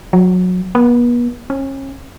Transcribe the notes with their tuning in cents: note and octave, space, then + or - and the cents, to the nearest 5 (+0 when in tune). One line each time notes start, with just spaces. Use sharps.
F#3 -25
B3 -40
C#4 -35